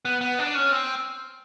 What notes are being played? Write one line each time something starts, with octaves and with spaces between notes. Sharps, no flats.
B3
B3
D4
C#4
C4